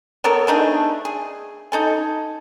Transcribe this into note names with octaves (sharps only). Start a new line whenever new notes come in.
B3 A4 A#4 C#5
A3 D4 D#4 G#4
G#4
D#4 A4 G#5